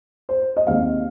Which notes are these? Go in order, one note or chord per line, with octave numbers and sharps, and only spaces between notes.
C5
D#5
D#2 D#3 G#3 C4 F5